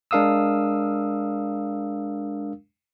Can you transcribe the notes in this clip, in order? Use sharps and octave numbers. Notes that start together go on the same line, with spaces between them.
G#3 D4 A#4 F5 D#6 E6